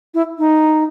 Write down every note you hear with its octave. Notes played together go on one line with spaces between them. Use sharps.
E4
D#4